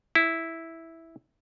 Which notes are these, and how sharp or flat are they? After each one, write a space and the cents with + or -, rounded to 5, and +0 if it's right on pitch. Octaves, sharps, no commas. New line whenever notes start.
E4 -5